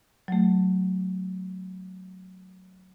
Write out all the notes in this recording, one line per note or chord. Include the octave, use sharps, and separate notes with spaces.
F#3 A3